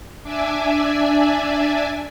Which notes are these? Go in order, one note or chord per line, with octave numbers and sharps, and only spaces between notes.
D4 D5 E5 G#5